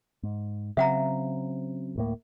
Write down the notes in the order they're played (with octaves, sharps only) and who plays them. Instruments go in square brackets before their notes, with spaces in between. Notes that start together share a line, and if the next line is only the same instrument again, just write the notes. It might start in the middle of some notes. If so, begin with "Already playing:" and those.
[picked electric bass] G#2
[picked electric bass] C#3 F#3 C4 [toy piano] E5 F#5 A#5
[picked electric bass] D1 A2 A#3